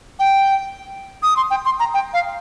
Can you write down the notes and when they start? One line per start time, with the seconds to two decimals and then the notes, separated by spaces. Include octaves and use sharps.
0.20 G5
1.23 D#6
1.37 C6
1.50 G5
1.65 C6
1.80 A#5
1.94 G5
2.13 F5